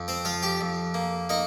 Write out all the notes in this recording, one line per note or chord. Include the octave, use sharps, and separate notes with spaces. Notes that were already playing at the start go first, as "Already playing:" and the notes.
Already playing: F2
C4 C5
F3 F4 F5
G4 G5
F2
A#3
A#3 D#4 D#5